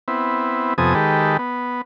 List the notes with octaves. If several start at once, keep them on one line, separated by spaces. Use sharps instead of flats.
B3 C4 E4
F2 C3 B3 A4 G#5 D#6
D#3 G#3 G4 A4 B4
B3